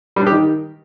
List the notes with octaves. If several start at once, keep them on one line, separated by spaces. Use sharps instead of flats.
G3
D4
G4
D#3